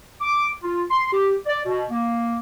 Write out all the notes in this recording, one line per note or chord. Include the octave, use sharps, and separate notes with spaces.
D6
F4
C6
G4
D5
B2
A#3